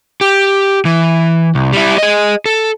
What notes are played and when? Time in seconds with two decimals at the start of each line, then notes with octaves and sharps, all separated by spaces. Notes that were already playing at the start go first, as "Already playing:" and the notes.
0.21 G4
0.85 E3
1.55 C2
1.73 G3 E4
1.98 G#4 D#5
2.46 A4